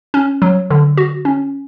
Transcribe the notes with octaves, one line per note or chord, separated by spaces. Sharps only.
C#4
F#3
D3
F#4
C#4